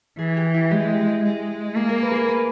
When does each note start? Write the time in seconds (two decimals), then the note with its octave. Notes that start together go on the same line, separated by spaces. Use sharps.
0.19 E3 G#4
0.37 G4
0.54 E4
0.71 G#3 G4
1.23 G#3
1.76 A#3 G#4
1.89 A#4
2.02 B4
2.11 G#4 A#4
2.29 B4